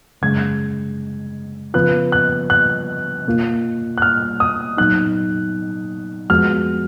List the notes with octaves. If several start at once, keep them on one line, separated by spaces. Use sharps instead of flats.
F#2 C#3 G#3 G#6
C#3 F3 B3 F4 B4 F#6
F#6
F#6
B2 A#3 F4
F#6
F6
D#6
A#2 F#3 B3 D#4 F#6
F2 F3 G#3 B3 F#4 F6